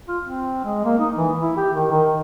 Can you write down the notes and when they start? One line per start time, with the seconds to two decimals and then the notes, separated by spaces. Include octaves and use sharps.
0.08 F4
0.23 C4
0.65 G#3
0.85 A#3
0.99 D#4
1.16 E3
1.41 E4
1.57 G4
1.74 D#3
1.91 D#3